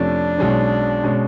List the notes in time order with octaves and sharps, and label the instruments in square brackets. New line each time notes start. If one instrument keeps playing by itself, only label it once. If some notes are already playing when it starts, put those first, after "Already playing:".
Already playing: [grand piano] F2 C3 F3 A3 C#4 [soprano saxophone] D4
[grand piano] B1 B2 G#3 C#4
B2 G#3 C#4